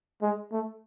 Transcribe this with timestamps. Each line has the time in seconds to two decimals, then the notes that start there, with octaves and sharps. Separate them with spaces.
0.22 G#3
0.52 A3